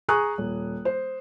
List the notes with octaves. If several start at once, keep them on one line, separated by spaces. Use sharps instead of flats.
G#4 G#5 A#5 C#6 D#6 F#6
D#1
C5